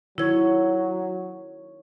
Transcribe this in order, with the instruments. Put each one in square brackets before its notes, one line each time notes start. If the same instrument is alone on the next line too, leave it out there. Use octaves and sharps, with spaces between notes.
[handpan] D#3 C#5 [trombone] F#3 [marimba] E4 G#6